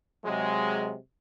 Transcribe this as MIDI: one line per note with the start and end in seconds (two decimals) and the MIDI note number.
0.25 0.96 48
0.25 0.96 54
0.25 0.96 56